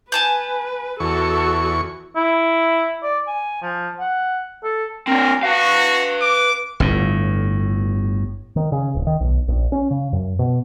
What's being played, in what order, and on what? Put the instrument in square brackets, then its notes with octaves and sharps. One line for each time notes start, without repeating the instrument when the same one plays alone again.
[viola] B4 [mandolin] G#5 A5 G6
[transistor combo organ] E2 C#6 [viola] F#4 A4
[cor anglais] E4
D5
G#5
F3
F#5
A4
[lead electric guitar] C4 D4 [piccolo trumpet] A#4
[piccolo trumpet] F#4 [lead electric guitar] B4 F5
[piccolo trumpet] D6
[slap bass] G1 A2
[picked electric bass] D#3
C#3
D1
D#3
B1
A#1
C#4
C#3
F#2
B2